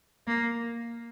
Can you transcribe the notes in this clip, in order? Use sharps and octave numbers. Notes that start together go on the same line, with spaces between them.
A#3